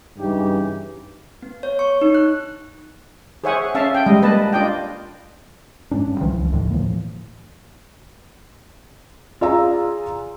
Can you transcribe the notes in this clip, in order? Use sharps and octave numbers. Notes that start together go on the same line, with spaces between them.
G2 C#3 E3 D#4 G4
B3
C#5
C#6
D#4
F#6
G#4 C5 C#5 E5 F#5 G#5
C#4 E5 F5 A5
G5
G3 G#3 D#5
A#3 B4 D#5 A5
D4 F4 D5 D#5 G5
G#2 C#4 D4
G2
C2 E3 F3 G3
C#2
D#2 A2 D3 F3
A2 E3 F3 A#3
F4 G#4 D5 F5 A#5 E6